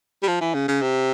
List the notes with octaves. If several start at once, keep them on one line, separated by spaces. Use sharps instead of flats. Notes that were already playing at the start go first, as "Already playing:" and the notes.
G3
F3
E3
C#3
C#3
C3